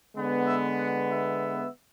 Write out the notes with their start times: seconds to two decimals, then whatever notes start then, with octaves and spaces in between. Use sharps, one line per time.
0.16 D3 G#3 B3
0.47 E5
0.78 F#5
1.10 E5